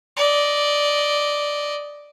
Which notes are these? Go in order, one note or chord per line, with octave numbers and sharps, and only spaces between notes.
D5 D#5